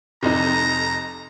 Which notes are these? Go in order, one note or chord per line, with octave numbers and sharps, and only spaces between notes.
F1 F2 C3 D#4 A#5